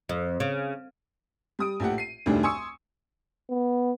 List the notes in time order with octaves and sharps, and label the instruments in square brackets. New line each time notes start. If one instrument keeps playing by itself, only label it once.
[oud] F2
C#3
[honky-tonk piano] G3 D#6 D7
A#1 A2 G4 F#5
C7 D#7
F1 D2 A2 D#3 G3 D4
G#5 C6 C#6 D#6 E6 C#7
[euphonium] B3